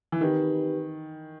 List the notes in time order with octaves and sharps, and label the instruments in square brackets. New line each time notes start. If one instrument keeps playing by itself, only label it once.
[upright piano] E3
[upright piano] D#3 [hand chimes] C4 D#4 G4 B4 D#5